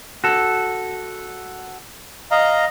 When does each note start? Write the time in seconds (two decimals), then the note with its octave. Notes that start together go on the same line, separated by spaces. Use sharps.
0.24 F#4 A4
2.31 D#5 F5 A#5